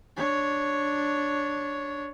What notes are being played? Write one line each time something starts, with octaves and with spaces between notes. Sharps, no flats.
D4 C#5